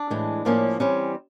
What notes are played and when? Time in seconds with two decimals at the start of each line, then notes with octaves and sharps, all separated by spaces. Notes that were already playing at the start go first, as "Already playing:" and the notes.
Already playing: D4
0.10 A2 E3 G#3
0.45 A2 F3 A#3 C#4
0.80 E3 G3 C4 C#4